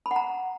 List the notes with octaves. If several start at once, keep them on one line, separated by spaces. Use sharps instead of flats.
B5
F#5
A#5